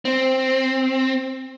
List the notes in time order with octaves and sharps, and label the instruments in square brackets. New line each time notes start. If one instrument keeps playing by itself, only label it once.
[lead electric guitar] C4